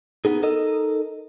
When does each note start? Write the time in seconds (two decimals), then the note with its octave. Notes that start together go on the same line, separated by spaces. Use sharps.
0.25 B3 D#4 G#4
0.43 D#4 A4 A#4 D#5